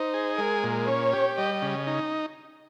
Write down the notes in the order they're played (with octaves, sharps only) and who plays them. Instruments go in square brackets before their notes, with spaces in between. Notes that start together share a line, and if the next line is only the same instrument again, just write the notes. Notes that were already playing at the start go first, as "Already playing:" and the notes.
Already playing: [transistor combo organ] D#4 [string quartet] C5
[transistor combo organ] G#4
[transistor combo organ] G#3 [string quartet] A#4
[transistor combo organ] A#2
[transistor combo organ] C#4 [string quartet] C#5
[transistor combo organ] G4
[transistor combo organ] G3 [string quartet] D#5
[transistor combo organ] C#3
D#4